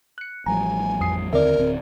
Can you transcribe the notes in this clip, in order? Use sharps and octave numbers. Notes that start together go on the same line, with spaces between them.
F#6 C#7
A1 F3 G3 G#5 A#5
F2 D#6 C7
D#2 D3 C4 A#4 D5 E5
D1 D3 C4